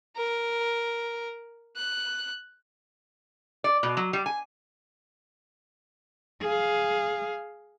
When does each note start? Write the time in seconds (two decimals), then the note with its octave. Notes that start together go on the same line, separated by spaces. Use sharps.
0.17 A#4
1.76 F#6
3.64 D5
3.83 B2
3.97 F#3
4.13 G3
4.26 G#5
6.42 G#4 F5